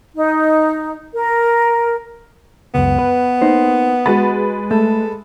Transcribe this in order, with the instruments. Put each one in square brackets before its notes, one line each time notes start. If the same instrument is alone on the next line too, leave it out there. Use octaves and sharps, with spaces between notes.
[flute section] D#4
A#4
[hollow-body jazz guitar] C#2 F#2 [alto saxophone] B3
[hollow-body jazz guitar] B4
A#3 D#4 C5
[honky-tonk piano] G#3 B4 A6 [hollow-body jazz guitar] F#4 B5
[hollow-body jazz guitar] A3 [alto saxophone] A4